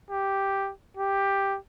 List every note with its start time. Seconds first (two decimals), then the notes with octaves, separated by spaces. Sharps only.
0.10 G4
0.97 G4